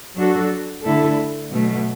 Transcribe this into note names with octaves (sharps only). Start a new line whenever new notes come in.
F#3 D4 F#4 A4
D3 A3 E4 A4
B2 F#3 A3